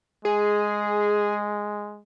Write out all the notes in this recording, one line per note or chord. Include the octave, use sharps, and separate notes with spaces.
G#3 G#4